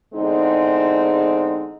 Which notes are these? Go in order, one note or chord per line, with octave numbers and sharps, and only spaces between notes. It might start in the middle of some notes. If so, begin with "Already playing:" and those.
E2 D3 G#3 C4 D#4